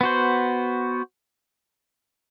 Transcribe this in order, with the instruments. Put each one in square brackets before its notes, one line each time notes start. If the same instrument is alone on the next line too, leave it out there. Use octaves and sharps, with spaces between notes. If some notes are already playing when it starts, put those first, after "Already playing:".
[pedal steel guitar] B3 F#4 C5